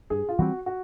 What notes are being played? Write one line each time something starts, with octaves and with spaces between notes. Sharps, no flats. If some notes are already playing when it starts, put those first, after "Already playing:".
G2 G#4
F4
E3 G3 C4 F#4
F#4